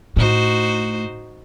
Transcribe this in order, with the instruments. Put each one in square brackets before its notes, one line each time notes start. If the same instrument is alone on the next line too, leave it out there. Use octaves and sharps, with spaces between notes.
[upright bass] A2 [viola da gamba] D#4 F#4 C5